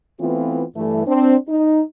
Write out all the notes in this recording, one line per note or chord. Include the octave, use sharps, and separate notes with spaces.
E3 A3 B3 C4 F4
G2 E3 A3
C4 D4
D#4